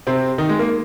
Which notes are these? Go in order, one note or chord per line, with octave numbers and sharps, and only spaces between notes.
C3 C4
D#3 D#4
G#3
A#3